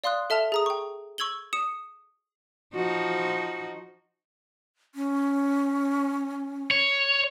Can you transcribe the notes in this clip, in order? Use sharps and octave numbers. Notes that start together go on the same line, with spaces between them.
D5 F5 C6 D#6 F#6
A4 E5 A5 F6 F7
G#4 A#5 D#6
G5 C#6
C#6 E6 G#6 F#7 G7
D#6 C#7 E7
F3 D#4 F#4
C#4
C#5